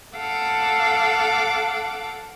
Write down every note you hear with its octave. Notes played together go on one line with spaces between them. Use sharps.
A4 F5 F#5 D6 E6